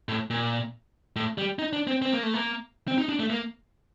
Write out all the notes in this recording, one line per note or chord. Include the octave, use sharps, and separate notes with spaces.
A2
A#2
A2
G3
D#4
D4
C4
C4
A#3
A3
A#3
C4
D#4
D4
A3
A#3